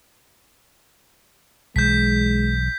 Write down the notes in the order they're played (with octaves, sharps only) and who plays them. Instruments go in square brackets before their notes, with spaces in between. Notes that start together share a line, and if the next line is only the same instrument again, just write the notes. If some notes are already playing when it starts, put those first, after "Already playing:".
[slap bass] B1 E3 [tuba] G#3 [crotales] G6 B6